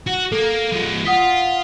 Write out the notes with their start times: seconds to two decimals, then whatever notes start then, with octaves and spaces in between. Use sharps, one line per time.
0.07 F#4
0.32 A#3 A4
0.72 F3 G#3
1.05 F4 F#5 D#6 B6